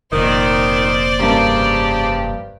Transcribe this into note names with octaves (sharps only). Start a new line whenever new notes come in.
F1 A#2 D#3 C5 D5
G2 C#3 A#3 G4